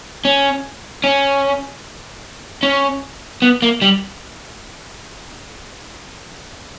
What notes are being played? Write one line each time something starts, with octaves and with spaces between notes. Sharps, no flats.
C#4
C#4
C#4
B3
A#3
G3